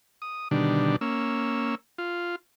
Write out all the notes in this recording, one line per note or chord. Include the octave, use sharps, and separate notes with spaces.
D#6
B2 D3 D#3 G3 D4
A#3 C#4 E6
F4